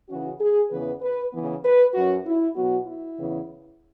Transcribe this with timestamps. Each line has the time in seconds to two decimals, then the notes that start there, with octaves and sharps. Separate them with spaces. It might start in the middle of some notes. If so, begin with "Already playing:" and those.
0.09 C#3 E3 C#4 F#4
0.40 G#4
0.71 E2 C#3 E3 B3 B4
1.01 B4
1.32 C#3 E3 B3
1.64 B4
1.94 F#2 F#3 C#4 F#4
2.25 E4
2.56 B2 F#3 B3 F#4
2.86 E4
3.17 E2 C#3 E3 B3